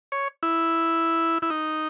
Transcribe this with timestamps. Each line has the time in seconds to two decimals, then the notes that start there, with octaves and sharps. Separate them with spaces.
0.12 C#5
0.43 E4
1.42 E4
1.50 D#4